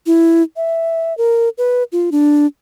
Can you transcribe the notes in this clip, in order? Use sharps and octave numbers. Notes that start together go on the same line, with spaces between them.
E4
E5
A#4
B4
F4
D4